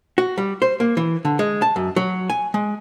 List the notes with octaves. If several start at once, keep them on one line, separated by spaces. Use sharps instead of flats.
F#4
G3
C5
A#3
E3
D3
G#3
A5
F#2
F#3
G#5
G#3